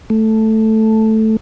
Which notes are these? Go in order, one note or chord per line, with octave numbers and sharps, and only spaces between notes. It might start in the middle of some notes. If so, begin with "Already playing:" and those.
A3